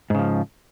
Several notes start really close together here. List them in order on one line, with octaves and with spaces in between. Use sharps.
G#2 C#3 F3